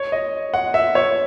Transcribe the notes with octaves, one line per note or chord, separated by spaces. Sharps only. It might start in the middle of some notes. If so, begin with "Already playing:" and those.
Already playing: C#5
D#5
F#5
E5
C#5